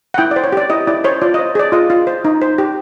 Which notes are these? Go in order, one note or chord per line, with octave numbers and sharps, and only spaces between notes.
F#5
E4 G5
D5
C5
C#5
G4 D5
E4 D#5
E4 D5
C5 C#5
F4 D5
D#5
C5
G#4 D5
F4 D#5
F4
C5
D#4
C5
G4